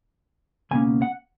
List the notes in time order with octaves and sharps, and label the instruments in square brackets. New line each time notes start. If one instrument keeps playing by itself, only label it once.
[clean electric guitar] C#2 B2 A#3 C#4 G#5
F#5